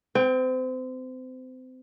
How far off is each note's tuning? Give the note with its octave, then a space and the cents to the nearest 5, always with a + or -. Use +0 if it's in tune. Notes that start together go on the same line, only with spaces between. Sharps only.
C4 -30 G5 +20